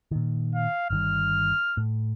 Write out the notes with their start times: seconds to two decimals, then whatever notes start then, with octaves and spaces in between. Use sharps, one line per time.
0.11 A#2 D#3
0.55 F5
0.90 G1 D#3 G3 F6
1.77 A2